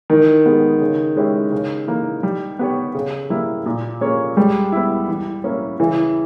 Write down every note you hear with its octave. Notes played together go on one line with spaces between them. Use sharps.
D#3 E3
G#3 B3 G4
C#3
G#3 C#4 E4 G4
C#3
E3 A#3
G3
B3 G4 C#5
C#3
G3 A#3 E4
A#2
A#3 C#4 G#4 C#5
G3 G#3
B3 E4
E3
A#3 C#4 E4 A#4
C#3 E3